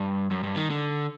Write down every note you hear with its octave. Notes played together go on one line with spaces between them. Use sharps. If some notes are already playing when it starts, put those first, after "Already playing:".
Already playing: G2
F#2
G2
D#3
D3